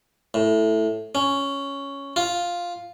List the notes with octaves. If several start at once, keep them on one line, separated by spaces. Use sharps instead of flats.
A2
C#4
F4